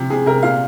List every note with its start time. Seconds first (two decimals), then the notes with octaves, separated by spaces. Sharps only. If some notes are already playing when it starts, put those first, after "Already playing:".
Already playing: C3 F3
0.10 C3 G#4
0.26 C3 A#4
0.43 A#2 F5